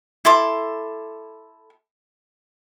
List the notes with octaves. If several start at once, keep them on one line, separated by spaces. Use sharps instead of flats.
E4 A4 C6 D6